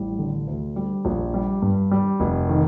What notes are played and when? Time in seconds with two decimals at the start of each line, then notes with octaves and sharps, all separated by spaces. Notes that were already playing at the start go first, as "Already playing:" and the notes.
Already playing: A1 G3
0.19 D3
0.47 D2
0.76 G3
1.05 A#1
1.34 G3
1.62 G2
1.91 G3
2.20 F1
2.49 D#3